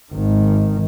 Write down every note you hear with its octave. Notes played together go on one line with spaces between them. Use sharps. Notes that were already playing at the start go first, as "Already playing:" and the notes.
G#1 D#3